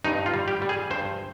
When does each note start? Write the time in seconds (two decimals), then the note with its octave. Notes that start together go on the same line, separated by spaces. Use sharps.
0.04 G2 D#4
0.26 F4
0.34 G3
0.48 G4
0.62 G3
0.69 G#4
0.90 G2 C5